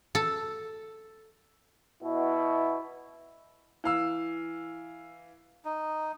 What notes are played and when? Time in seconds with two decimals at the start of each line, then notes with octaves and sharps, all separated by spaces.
0.15 A4
2.03 B2 E4
3.84 E3 F5 E6
5.65 D#4